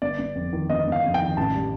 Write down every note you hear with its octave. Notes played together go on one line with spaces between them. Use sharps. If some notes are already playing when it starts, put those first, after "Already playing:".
G1 D5
G1
F2
D#3
G1 D#5
G1
F5
F2
G5
D#3
A1 A5
G3